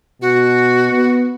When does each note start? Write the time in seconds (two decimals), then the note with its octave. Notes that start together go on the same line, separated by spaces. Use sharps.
0.22 B2 F#4
0.92 B3